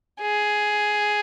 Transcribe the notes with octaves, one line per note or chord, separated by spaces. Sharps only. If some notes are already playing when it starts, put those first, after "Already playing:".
G#4